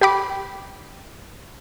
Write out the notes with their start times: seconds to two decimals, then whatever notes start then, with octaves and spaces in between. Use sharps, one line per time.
0.01 G4 G5 B5 D6